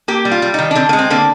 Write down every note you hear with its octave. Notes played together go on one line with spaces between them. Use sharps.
A#3 G4
G3
F4
G3
D#3 D#4
D4
D3 C4
A#3
G#3
C4
D3 A#3